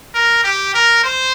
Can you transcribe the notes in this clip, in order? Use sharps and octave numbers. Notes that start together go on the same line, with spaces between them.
A#4
G4
A#4
C5